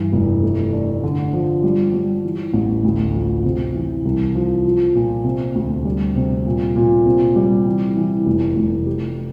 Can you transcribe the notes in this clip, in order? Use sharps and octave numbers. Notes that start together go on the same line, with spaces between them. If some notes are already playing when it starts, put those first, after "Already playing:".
Already playing: G2 E3
F1
A3
D4
D3
F3
G3
G3
E3
A1
D2
F3
C3
E3
C2
F3
F4
A#2
C3
D2
G3
C3
A#2
A#2
C3
G3
E3
E3
F1
F1
G4